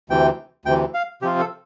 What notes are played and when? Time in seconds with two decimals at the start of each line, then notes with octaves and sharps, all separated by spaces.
0.10 D2 C3 E3 G5
0.65 D2 C3 E3 G5
0.94 F5
1.22 C3 F3 C4 F4 G4
1.39 A4